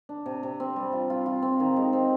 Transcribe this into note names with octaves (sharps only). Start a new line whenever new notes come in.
D4
C3
C3
C4
G3
F4
F4
F4
C4
D#3
G#3
C4